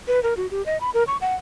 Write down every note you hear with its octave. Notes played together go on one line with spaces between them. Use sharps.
B4
A#4
F#4
G4
D#5
B5
A#4
C#6
F#5